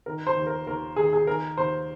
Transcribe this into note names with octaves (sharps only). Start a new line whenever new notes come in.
D#3 A#4
C5
D#2
A#4
D#2 A#4
D#3 G#4
G#4
D#3 A#4
D#2 C5